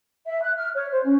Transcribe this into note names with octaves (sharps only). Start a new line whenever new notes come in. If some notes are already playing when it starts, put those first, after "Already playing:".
E5
F#6
F6
C#5
C5
C#4